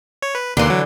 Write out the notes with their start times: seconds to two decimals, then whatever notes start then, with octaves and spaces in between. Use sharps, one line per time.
0.22 C#5
0.35 B4
0.57 D#2 D3 E3 A#3 C6
0.70 F#3